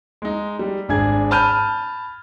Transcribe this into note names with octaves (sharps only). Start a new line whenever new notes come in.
G#3 D#4
G3
G#1 D4 G#4 G#6
A5 B5 F6 G6 D#7